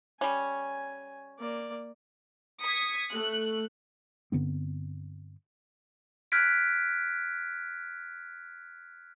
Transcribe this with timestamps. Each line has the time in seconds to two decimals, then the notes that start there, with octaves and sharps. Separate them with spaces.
0.21 G3 C#4 G#5
1.39 A#3 D5
2.61 D#6 G#6 B6 C#7
3.11 A3 F#6
4.32 G2 D3 B3 C4
6.32 F6 F#6 G#6 B6 D7